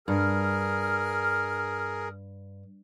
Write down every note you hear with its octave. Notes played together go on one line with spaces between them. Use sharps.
G2 G#4 A#4 F6